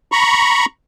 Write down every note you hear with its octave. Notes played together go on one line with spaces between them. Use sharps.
A#5 B5 C#6